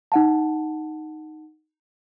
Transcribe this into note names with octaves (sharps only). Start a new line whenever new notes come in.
D#4 F#5 A5